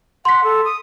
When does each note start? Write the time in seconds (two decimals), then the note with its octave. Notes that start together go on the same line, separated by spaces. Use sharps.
0.25 F#5 C6 B6
0.44 A4
0.65 D#6